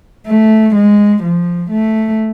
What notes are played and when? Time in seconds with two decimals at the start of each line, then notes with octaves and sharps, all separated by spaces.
0.27 A3
0.75 G#3
1.23 F3
1.71 A3